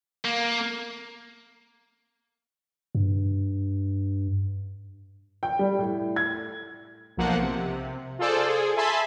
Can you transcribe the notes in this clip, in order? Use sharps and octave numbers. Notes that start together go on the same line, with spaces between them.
A#3
G2
G5
G3
A2
G#6
B1 F3 A#3 F#5
C3
F4 G#4 A4 C5 D5
G#4
E5 G#5 A5 B5 C6